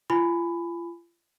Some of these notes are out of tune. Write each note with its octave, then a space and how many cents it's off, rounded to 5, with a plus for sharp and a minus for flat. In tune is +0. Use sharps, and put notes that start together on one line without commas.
F4 -35 G#5 +0 B5 +15